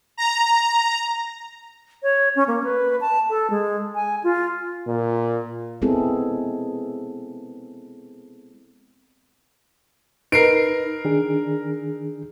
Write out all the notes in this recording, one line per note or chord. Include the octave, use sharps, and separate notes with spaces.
A#5
C#5
C#4
A#3
B4
A5
A4
G#3
G#5
F4
A#2
G#3 B3 C4 E4 G#4 A4
D#4 A#4 B4 C7 D7
D#3 D4 G#4